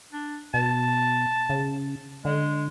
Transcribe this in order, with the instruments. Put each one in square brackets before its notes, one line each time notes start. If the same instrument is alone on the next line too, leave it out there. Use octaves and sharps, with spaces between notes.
[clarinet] D4
[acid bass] B2 [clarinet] A5
[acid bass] C#3
[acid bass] D3 [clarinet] G#3